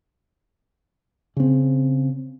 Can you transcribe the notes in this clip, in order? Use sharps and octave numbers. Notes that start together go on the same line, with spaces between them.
C#3 C4